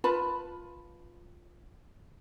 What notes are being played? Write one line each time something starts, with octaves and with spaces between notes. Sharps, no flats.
F4 B4 A5 B5